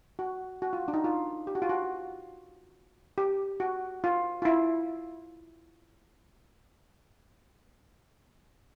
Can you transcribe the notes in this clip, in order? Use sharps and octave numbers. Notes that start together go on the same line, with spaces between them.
F#4
F#4
F4
D4
D#4
F4
G4
F#4
F4
F#4
G4
F#4
F4
F4
E4